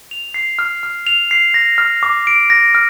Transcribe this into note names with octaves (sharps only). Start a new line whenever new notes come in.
F7
C7
F6
F6
F7
C7
A#6
F6
D6
D7
A#6
F6